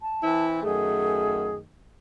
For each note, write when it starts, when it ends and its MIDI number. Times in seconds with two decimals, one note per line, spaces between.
0.02 0.45 81
0.22 0.59 52
0.22 0.59 60
0.22 0.59 64
0.63 1.63 42
0.63 1.63 51
0.63 1.63 57
0.63 1.56 68